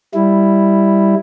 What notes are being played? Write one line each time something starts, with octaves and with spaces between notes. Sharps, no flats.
G3 E4